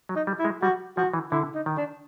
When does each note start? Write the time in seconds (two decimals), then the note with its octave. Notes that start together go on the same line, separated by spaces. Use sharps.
0.09 F#3
0.16 D#4
0.27 G3
0.39 E4
0.45 G#3
0.62 G3 F#4
0.97 F3 F#4
1.14 E3
1.31 D3 E4
1.54 D#4
1.66 D#3
1.77 D4